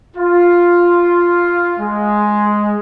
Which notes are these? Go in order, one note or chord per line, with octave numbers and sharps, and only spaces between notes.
F4
G#3